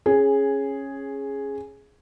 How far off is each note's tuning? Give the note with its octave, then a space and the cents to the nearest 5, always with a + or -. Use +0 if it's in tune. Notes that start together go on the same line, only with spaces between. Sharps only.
C#4 -15 G#4 +0